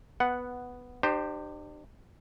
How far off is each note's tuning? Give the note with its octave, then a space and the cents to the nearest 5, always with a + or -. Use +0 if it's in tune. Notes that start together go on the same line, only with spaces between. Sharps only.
B3 +0 F#5 +0
D4 +40 G4 -5 C5 +0